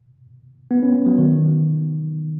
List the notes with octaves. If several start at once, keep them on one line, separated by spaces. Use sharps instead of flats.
B3
C#4
B3
F#3
D#3